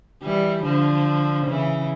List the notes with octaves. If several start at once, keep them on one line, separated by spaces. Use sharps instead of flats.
E3 G3
D3 F3
C#3 E3